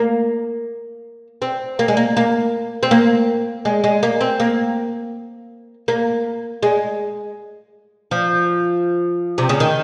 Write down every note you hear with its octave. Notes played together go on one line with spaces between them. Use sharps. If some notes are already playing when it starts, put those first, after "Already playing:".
Already playing: A#3
C4
A#3
G#3
A#3
A#3
C4
A#3
G#3
G#3
A#3
C4
A#3
A#3
G#3
F3
C3
C#3
D#3